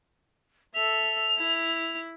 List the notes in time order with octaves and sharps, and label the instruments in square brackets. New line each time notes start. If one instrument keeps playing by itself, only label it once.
[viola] A4 E5 [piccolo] F7
[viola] E4